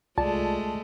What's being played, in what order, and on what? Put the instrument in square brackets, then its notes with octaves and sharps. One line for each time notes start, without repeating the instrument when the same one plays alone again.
[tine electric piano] C2 F4 D5 [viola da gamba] G#3 A3 [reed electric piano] A5